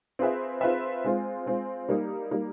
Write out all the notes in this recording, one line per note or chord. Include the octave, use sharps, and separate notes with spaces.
C4 F4 G#4 B4 E5
C4 F4 G#4 B4 E5
G#3 C4 F4
G#3 C4 F4
G3 A#3 D#4
G3 A#3 D#4